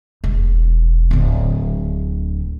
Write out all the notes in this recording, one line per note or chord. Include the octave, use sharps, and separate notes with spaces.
E1
D1 D3